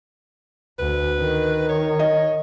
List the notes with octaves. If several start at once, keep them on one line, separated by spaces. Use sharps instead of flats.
D2 B4
D#3
C#5
D#5